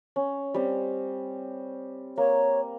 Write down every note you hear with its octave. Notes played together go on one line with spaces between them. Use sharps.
C#4
G3 C4
A#3 C#5